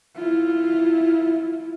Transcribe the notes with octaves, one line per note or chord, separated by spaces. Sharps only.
E4 F4